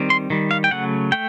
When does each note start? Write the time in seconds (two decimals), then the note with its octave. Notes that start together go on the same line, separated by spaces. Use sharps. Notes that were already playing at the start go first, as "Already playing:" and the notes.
Already playing: D#3 G3 C4
0.10 C6
0.30 D#3 G3
0.51 F5
0.64 G5
0.71 C#3 F#3 A3 F#5
1.12 A3 G5